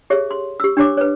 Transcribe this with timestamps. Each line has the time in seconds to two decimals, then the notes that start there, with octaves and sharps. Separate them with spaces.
0.10 G4 G#4 C#5 E5
0.31 C6
0.60 G4 E6
0.77 D4 G4 C#5 D6
0.97 B4 C#5